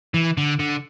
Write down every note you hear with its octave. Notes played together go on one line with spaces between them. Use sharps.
E3
D3
D3